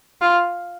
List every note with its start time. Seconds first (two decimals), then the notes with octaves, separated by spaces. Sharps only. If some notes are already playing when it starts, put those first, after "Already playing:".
0.21 F4